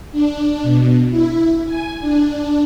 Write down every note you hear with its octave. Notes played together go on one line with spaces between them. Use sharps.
D4
B2
E4
G#5
D4